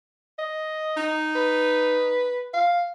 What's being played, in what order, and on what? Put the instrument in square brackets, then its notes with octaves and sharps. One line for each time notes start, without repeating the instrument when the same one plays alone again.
[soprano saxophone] D#5
[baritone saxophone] D#4
[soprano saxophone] B4
F5